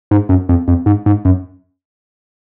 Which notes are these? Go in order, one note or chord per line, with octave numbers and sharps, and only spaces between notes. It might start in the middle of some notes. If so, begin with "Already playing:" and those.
G#2
F#2
F2
F2
G#2
G#2
F#2